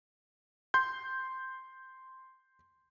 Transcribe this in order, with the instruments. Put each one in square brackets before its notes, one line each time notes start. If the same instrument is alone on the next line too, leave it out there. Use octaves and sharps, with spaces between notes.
[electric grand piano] C6 G6